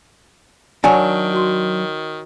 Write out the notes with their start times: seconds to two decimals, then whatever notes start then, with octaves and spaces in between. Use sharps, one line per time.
0.84 D#3 F#3 D4 C#5 F#5 G#5 C#6
1.33 F#4 C6